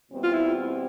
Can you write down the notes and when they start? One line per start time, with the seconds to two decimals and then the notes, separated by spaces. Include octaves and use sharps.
0.12 E2 B2 G3 C4
0.23 F4
0.34 E4